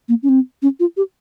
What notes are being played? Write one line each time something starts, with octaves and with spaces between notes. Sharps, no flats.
A#3
C#4
C4
C#4
F4
G4